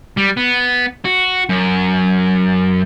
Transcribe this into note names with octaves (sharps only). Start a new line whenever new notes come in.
G3
B3
F#4
F#2